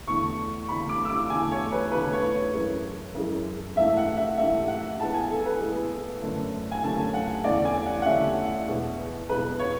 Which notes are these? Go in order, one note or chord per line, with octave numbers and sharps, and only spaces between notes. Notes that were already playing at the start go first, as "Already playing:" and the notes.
E2 D3 A3 C#6
E2 D3 A3 B5
D6
E6
D6
E2 D3 A3 G#5
C#5
B4
E2 D3 A3 B4
C#5
F#2 E3 G#3
F#2 E3 G#3
G#2 E3 A3 E5
F#5
E5
G#2 E3 A3 E5
F#5
A2 G#3 B3 A5
G#5
A4
B4
A2 G#3 B3
F#2 D3 A3 C#4
G#5
F#2 D3 A3 C#4 A5
F#5
E2 D3 A3 C#4 D5
G#5
F#5
F#5
E2 D3 A3 C#4 E5
E2 B2 G#3 B3
E2 B2 G#3 B3 B4
C#5